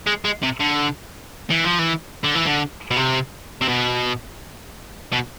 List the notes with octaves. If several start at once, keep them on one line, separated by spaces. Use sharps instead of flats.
G#3
G#3
C3
D3
E3
F3
E3
D3
E3
D3
B2
C3
C3
B2
B2